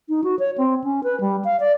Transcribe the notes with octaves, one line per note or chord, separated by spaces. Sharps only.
D#4
F#4
C#5
C4
C#4
B4
G3
F5
D5